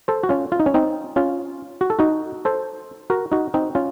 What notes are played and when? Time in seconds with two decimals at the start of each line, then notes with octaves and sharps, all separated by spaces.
0.08 A4 C5
0.23 F#4
0.29 C#4 F4
0.52 F4
0.60 D#4
0.66 C#4
0.74 C4 D#4
1.16 C#4 F4
1.81 F#4
1.90 A4
1.99 D#4 F#4
2.45 A4 C5
3.10 F#4 A#4
3.32 D#4 F#4
3.54 C4 D#4
3.75 C#4 F4